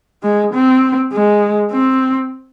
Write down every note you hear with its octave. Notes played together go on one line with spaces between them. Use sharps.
G#3
C4
G#3
C4